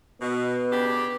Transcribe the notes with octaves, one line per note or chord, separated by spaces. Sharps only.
B2 B3
C#3 D4 G4